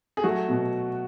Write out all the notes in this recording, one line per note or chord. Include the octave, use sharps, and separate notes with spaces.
G#4
F#3 A3 F#4
B2